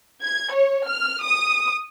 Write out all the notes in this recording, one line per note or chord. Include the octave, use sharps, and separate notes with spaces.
G#6
C#5
F6
D#6